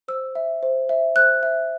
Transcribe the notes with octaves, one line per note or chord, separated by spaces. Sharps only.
C5 E6
E5
C5
E5
C5 F#6
E5